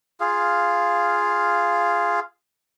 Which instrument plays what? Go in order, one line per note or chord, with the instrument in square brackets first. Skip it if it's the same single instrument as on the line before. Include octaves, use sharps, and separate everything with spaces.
[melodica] F4 G#4 F5